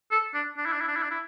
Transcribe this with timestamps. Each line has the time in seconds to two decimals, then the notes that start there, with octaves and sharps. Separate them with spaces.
0.11 A4
0.34 D4
0.57 D4
0.66 E4
0.73 D4
0.81 E4
0.88 D4
0.96 E4
1.03 D4
1.11 E4